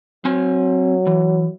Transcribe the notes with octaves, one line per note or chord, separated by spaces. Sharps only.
F#3 C4 G#5
E3